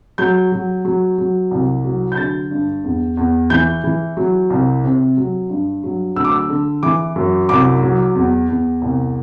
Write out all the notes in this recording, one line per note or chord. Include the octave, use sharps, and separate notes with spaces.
F#3 G6
F#3
F#3
F#3
C2
F#3
G6
D3 A6
G2
E2
E2
E3 G6
E3
F#3
C2
C3
F#3
G2
F#3
D2 E6
D6
E6
D3
E3 D6
F#2
C2 D6
F#3
E2
E2
C2